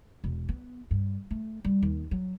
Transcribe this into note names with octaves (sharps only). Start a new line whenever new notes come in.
E1
B3
G2
A3
G3
D#2
F#3